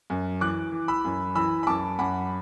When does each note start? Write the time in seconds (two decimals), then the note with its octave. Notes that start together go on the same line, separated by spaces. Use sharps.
0.10 F#2
0.41 E3 D6 F#6
0.72 E3
0.88 B5 E6
1.05 F#2
1.36 E3 B5 E6
1.63 B5
1.67 F#2 A5 D6
1.99 F#2 F#5 B5